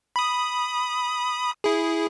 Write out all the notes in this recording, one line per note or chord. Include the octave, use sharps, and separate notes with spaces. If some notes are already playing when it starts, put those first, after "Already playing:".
B5 D#6
E4 G#4